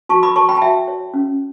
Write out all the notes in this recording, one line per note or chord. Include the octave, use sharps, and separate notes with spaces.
F#4 A5 C#6
B5 D6
C#5 A5 C#6
G5 B5
A5
F#4 E5 G5
C#5
C#4